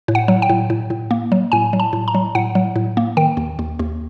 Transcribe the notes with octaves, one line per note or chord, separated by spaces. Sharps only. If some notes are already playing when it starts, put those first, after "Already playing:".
A2
F#5
F#3
G5
A2
A2
A2
A#3
F#3
A2 G#5
F#3
A5
A2
A#5
F#3
A2 F#5
F#3
A2
A#3
D#3 G5
D#2
D#2
D#2